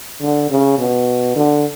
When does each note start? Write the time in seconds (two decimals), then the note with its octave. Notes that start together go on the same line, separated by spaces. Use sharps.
0.22 D3
0.50 C#3
0.79 B2
1.36 D3